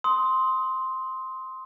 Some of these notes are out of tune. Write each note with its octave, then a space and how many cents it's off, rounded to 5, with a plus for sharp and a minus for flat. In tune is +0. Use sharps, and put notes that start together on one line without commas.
C6 +0 D#6 +25